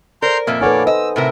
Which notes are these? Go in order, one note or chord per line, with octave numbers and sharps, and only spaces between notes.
A#4 C5 D5 A#5 C6 G6
F2 A#2 A#3 E5
D#4 A4 B4 C#5 D5 F#5 G#5
C5 D#5 E6
A2 C3 A#4 E5